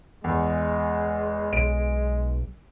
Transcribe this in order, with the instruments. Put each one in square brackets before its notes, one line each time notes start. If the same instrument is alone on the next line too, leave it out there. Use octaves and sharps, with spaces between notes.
[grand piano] E2 [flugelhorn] G#3
[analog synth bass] B1 [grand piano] D7